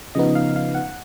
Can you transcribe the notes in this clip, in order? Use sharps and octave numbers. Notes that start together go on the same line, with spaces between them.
C#3 F3 B3 D#4 D#5
F5
F5
F#5